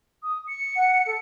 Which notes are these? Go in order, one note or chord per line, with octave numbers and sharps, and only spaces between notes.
D#6
C#7
F#5
A4